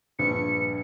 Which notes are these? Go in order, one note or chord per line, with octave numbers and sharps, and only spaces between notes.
A#1 G2 B4 C#7